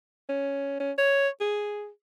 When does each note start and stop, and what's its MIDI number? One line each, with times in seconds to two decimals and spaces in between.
0.29 0.78 61
0.80 0.92 61
0.98 1.29 73
1.41 1.89 68